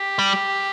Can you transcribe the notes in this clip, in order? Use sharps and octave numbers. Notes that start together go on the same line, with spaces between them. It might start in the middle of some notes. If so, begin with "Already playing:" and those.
Already playing: G4
G3